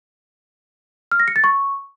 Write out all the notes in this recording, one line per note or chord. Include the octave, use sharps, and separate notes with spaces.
F6
A#6
C#7
A6
C#6